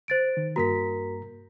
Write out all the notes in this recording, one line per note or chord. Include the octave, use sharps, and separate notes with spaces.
C5 A6 D7
D#3
G2 A#3 F#4 A#4 A#5 B6